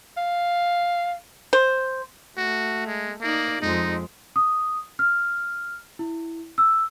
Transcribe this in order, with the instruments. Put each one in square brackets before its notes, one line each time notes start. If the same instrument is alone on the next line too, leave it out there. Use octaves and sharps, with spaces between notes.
[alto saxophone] F5
[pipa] C5
[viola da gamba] A3 [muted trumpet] F#4
[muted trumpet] G#3
[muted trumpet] A#3 [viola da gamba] D#4 D5
[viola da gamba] F2 G#3 [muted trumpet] D#4
[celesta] D#6
F6
E4
E6